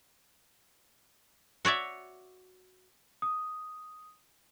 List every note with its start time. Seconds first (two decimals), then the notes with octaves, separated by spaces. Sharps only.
1.65 F#4 C#5 D5 E5
3.22 D#6